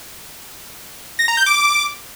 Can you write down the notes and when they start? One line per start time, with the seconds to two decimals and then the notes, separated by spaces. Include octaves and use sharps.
1.19 A#6
1.28 A#5
1.37 G6
1.46 D6